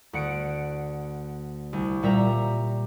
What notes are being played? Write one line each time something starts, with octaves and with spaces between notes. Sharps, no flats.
D2 F#5 C#7 D7
C2
A#2 G3 E5 A#5